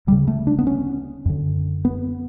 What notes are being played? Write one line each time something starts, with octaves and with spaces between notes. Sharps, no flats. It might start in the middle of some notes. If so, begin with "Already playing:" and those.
D2 C#3 G3
A3
D4
B3
C#4
F#2 D3
B3